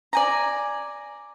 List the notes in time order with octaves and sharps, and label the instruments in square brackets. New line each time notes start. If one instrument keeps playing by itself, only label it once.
[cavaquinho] D5 G#5 A#5